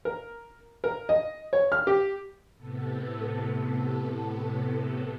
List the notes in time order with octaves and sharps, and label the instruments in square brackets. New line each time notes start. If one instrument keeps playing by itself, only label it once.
[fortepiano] A#4
A#4
D#5
C#5
F6
G4
[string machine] A2 C3 B3 A4